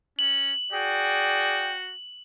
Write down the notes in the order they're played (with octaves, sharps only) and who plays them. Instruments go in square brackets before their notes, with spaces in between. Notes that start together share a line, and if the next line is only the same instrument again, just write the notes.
[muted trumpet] C#4 [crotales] F#7
[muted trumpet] F#4 [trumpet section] G#4 D5 G5